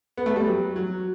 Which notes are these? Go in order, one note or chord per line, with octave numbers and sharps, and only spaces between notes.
B3
A3
G3
F#3
F#3